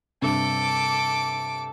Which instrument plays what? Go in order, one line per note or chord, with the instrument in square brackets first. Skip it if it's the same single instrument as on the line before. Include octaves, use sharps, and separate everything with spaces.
[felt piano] G2 C3 [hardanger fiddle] A4 D6